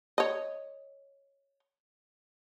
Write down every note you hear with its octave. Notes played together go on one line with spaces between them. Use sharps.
C#5 D#5